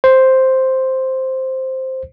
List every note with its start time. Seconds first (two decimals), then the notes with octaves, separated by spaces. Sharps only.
0.04 C5